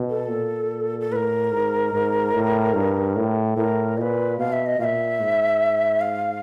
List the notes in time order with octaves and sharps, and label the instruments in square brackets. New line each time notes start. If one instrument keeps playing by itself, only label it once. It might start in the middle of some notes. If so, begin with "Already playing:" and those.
Already playing: [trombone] B2
[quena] A4
[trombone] A#2
[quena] A4
[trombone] A2 [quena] B4
[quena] A#4
[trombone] G#2
G#2
A2
G2
A2
[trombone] A2 [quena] A#4
[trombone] A#2 [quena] D#5
[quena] B4
[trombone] B2 [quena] F5
[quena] E5
D#5
[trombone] A#2 [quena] F5
[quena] E5
[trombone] G#2
[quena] F5